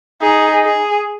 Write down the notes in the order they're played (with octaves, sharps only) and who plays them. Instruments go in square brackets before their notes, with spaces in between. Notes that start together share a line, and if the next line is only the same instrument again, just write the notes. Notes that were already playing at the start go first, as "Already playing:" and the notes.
[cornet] D#4 [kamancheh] G#4
[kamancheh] G#4